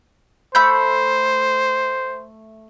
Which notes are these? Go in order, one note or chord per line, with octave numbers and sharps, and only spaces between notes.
A3 C5 B5 G6